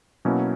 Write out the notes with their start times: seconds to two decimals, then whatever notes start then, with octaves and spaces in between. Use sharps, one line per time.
0.25 B2 F#3 A#3 C#4 E4